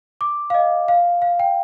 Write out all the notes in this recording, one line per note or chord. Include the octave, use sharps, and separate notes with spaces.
D6
F5
D#5
F5
F5
G5